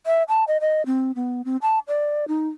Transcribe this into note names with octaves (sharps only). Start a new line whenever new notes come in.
E5
A5
D#5
D#5
C4
B3
C4
A5
D5
D#4